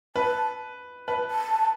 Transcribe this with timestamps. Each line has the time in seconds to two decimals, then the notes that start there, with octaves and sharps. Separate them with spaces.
0.16 B4 A5
1.08 B4 A5
1.31 A5